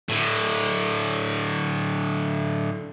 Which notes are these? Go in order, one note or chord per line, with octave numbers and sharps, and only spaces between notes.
A2 D3